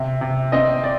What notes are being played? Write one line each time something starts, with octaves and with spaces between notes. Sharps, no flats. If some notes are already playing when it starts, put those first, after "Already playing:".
Already playing: C3
C3
C4 D#5
D5